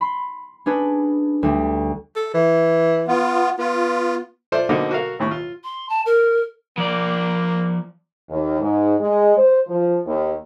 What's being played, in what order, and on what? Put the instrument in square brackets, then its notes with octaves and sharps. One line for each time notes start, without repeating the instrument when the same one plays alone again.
[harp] B5 C6
C#4 D4 G#4 B4
D2 G3
[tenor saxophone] A4
E3
[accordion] B3 F4
[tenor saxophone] B3 [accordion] F4
[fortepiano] F4 A4 C5 D5 E5
B2 D3 A#3 C4 D#4 A4
F#4 A4 A#4 F5
D#2 A2 C#6
F4
[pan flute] C6
A5
A#4
[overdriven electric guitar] F3 D5 [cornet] A#3
[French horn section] D#2
G#2
G#3
C5
F3
D#2